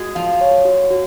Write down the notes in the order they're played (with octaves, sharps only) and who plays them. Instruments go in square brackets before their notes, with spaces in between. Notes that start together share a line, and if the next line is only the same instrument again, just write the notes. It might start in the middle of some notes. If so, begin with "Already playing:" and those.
Already playing: [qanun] G#3 G#4 [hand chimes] F#4
[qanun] F3 F4 [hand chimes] F5
[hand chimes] C#5
F#4
F#4